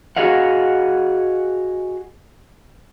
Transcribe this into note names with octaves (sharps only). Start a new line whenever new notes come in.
F#4 G#4 D#5 F5 F#5